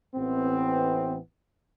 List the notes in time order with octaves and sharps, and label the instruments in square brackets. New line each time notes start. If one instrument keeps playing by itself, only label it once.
[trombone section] A1 A2 E3 B3 C4